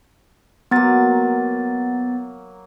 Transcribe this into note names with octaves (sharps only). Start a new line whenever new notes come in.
F#3 A#3 B3 A6